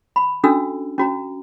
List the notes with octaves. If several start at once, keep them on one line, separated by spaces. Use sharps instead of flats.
B5
C#4 D4 F#4 A4 E6
C#4 F#4 A#5